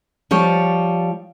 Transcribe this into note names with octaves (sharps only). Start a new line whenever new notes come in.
F3 G3 C#5